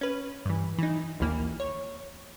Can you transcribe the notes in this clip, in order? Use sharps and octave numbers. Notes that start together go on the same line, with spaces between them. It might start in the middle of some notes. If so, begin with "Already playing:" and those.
C#4 B4
G2 E3
E3 D#4
A#1 D#2 E3 A#3
C#5